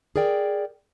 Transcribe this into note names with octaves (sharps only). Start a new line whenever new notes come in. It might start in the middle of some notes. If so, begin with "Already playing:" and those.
G#4 A#4 D5 G5